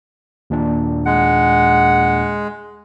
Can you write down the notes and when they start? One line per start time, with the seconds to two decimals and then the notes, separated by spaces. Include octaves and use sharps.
0.50 D#2 A#2 D4
1.06 G#3 F#5